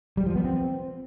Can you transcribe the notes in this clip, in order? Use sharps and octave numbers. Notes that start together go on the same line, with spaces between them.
G3
F3
B3
C4